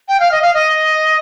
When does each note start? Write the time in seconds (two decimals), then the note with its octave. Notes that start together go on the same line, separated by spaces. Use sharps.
0.08 G5
0.20 F5
0.32 D#5
0.42 F5
0.54 D#5